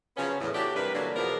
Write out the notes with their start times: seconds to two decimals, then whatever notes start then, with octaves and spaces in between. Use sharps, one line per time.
0.17 C#3 F3 F#3 B3 C#4
0.40 E2 A2
0.54 F#3 A3 D4 E4 G4
0.76 G2 C3 A#4 B4
0.94 D3 E3 F#3 G3 A#3 D4
1.15 E2 B2 F3 B3 D4 A#4